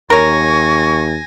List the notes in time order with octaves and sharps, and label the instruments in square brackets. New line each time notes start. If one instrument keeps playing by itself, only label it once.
[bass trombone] D#2 [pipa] A#4 C#5 [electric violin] G#5 A#6 [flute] C#6